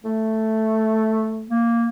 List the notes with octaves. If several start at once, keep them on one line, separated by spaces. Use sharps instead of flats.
A3
A#3